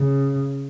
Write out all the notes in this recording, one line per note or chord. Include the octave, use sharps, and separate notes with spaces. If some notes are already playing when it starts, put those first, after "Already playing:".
Already playing: C#3